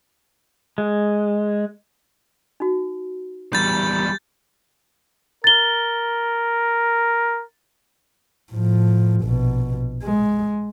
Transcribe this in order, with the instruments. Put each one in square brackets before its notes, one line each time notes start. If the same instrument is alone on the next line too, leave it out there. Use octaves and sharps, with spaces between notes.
[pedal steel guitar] G#3
[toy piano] D#4 F#4
[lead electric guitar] E2 G3 [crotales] G6 A6
[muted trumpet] A#4 [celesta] A6 G7
[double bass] A2 F3
A#1 B2
G#3